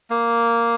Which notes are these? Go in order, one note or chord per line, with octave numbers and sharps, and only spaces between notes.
A#3